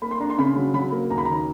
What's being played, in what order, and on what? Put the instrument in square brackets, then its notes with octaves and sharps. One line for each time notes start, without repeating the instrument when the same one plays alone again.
[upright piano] A#3 [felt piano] B5
[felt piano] C6
[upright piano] D4 [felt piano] A#5
[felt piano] C6
[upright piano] C#3 [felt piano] B5
[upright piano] F#3
[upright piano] F#3 [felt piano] B5
[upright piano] A#3
[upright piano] D#2 [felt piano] A#5
[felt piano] B5
[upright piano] D#3 [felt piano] A#5